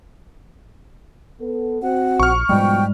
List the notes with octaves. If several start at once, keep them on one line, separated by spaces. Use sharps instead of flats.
B3 A4
C4 F#4 F#5
A#1 C#6 F6
G#2 B2 F3 G3 G#3 G5